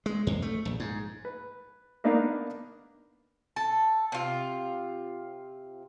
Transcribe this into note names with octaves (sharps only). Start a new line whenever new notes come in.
G#3
F2
A3
A#1
G#2
B4
A#3 B3 D4 D#4 A#4 F5
A4
C3 F4